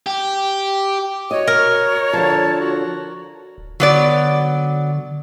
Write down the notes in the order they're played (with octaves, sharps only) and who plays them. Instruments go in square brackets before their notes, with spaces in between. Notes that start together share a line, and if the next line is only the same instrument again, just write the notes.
[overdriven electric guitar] G4
[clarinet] F#4 [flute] C#5 [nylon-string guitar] D#5
[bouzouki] A#4
[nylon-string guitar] D3 F3 [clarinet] A5
[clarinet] F#4
[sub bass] D1
[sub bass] D3 [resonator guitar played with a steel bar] F#3 B3 D5